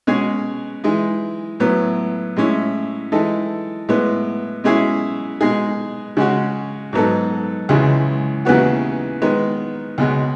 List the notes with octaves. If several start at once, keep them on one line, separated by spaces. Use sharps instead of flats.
B2 G#3 C#4 G#4
E3 G#3 D#4
A2 F#3 B3
A2 G#3 C#4 E4
E3 G#3 D#4 A4
A2 G#3 B3
B2 G#3 C#4 E4 G#4
B2 G#3 D#4 G#4
C#3 G#3 C#4 F#4
G#2 F#3 B3 D#4 A4
C#2 C#3 E3 G#3
D#2 C#3 E3 B3 F#4
D#3 G#3 B3
C#2 B2 G#3